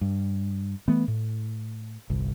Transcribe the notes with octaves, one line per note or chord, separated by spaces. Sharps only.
G2
E3 A3 B3
A2
G1 C2